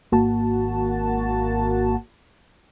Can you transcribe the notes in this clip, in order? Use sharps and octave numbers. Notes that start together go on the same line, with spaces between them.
G#1 A#3 F#4 A5